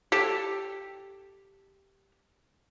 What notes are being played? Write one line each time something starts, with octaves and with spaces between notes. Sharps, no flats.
G4 A4